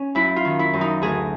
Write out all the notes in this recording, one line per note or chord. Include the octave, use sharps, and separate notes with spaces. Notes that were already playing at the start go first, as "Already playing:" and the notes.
Already playing: C#4
F#2 E4
F4
D#3
E4
F#2
D#4
D2 G#4